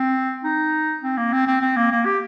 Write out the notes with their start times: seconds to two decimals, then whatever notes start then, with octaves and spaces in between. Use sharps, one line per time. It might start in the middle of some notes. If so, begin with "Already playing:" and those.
Already playing: C4
0.44 D#4
1.02 C4
1.17 A#3
1.33 C4
1.47 C4
1.61 C4
1.76 A#3
1.92 A#3
2.06 G4